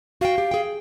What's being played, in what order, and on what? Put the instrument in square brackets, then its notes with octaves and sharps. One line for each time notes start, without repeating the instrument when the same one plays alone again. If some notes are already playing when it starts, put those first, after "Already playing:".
[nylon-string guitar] F#4 G5 [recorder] F5
[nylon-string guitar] G4
G#4 G5